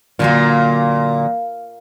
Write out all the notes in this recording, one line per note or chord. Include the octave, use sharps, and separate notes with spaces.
A#2 D3 F#3 A#3